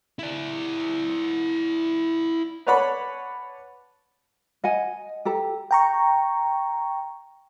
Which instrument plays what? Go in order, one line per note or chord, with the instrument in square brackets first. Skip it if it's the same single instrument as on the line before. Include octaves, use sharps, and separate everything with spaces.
[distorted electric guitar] E4 D5
[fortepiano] B4 C#5 D5 F#5 A5 B5
[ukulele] D#5 F#5 G#5
G4 A4 A#5
[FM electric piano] G5 A#5 C#6